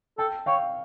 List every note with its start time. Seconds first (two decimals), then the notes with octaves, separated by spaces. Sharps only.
0.18 A4 G5 A5
0.46 C#5 F5 G5